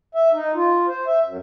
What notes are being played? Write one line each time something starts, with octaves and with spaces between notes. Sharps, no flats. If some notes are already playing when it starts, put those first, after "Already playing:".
E5
D#4
F4
C5
E5
F#2